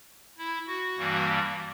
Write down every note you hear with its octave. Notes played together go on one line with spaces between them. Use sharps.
E4
F#4
G2 E3 G3 A#3